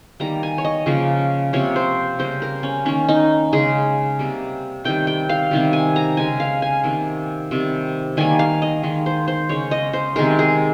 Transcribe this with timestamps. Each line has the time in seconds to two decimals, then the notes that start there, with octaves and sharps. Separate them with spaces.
0.20 D#3 G3 A#3 A#5
0.43 G#5
0.58 C#5
0.65 D#5
0.86 C#3 F3 A#3
1.53 C3 F3 A#3 C#5
1.76 C5
2.19 C#3 G3 A#3 C5
2.42 A#4
2.63 C#4
2.85 D#3 A#3 C#4
3.09 D#4
3.52 C#3 G#3 G#4
4.19 C3 G3 A#3
4.84 C3 D#3 G3 G5
5.07 G5
5.29 F5
5.51 C3 D#3 G3
5.73 G#5
5.96 A#5
6.17 C#3 G#3 G#5
6.40 F5
6.62 G#5
6.84 C3 D#3 A#3
7.51 C3 D#3 G3
8.17 D#3 G3 A#3 G#5
8.39 F5
8.62 D#5
8.83 D#3 G#3
9.06 C5
9.28 C5
9.49 C#3 G#3 C#5
9.71 D#5
9.93 C5
10.16 C3 D#3 G#3 A#4
10.39 G#4